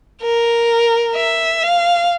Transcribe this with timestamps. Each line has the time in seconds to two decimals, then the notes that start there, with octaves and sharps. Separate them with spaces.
0.22 A#4
1.16 E5
1.63 F5